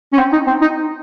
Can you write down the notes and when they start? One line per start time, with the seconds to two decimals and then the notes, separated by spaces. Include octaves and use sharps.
0.13 C#4
0.18 C4
0.33 D#4
0.47 C4
0.61 D#4